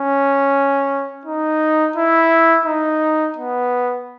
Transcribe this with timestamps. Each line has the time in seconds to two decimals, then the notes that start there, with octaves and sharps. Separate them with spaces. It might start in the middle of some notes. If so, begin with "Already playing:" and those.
Already playing: C#4
1.25 D#4
1.96 E4
2.66 D#4
3.36 B3